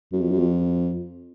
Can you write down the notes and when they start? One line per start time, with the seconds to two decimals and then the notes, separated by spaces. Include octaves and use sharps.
0.13 F#2
0.21 F2
0.31 F#2
0.39 F2